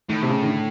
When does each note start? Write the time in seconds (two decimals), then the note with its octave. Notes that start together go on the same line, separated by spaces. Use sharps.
0.09 A2 D#3
0.23 C3
0.30 C#3
0.43 D#3
0.47 D3